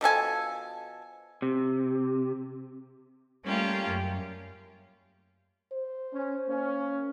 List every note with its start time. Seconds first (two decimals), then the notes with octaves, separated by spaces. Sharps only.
0.01 B2 F3 A4 G#5
1.42 C3
3.45 G3 A3 A#3 C#4 F4 G4
3.88 F#2
5.73 C5
6.13 C#4
6.48 A#3 C#4